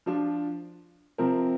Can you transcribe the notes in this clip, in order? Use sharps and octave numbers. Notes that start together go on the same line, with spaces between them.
F3 D4 F4
C3 F3 C4 A#4